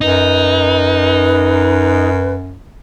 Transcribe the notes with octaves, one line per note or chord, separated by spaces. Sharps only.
F#2 D#4 B4